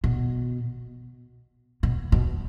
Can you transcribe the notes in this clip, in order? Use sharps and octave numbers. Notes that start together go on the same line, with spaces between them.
B2
B2
B2